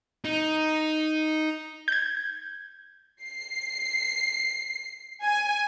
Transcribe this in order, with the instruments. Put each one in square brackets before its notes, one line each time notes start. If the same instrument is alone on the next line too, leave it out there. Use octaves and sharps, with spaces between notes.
[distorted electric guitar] D#4
[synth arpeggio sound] G6 G#6
[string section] C7
G#5